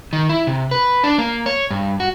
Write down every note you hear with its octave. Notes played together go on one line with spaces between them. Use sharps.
D#3
E4
C3
B4
D4
A#3
C#5
G2
F#4